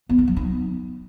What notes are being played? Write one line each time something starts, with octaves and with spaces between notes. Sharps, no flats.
B3
D#4
F#3
D#4